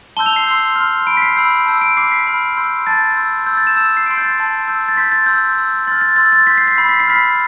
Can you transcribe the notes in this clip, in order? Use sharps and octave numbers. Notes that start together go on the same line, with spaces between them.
A5 C6 E6 G6 G7
F7
C7
C6 E6 G6
C6 F6
B5 F6 D7
B6
C7
B5 E6 G6
A5 E6 G6
D7
B5 D6 F6 C7
B6
B5 F6
C6 E6 G6
A5 D6 G6 A6
C6 E6 G6
C6 E6 G6
A6
E7
A5 E6 G6
C7
C6 E6 G6 D7
G6
A6
A5 C6 E6 G6
A5 E6 G6
A6
C6 G6 B6
A6
C6 E6 G6
C6 E6 G6
C6 F6 A6
A6
C6 E6 G6 A6
A6
C6 G6 B6
C7
B6
B5 E6 G6 C7
B6
C7
B5 F6 B6